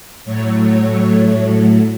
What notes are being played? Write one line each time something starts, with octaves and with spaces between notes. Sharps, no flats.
A2 F#3 A3 C#5
C#5